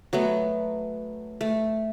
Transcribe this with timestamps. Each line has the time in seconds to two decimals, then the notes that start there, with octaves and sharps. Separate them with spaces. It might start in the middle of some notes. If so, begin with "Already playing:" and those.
0.13 F#3 A3 B3
1.41 A3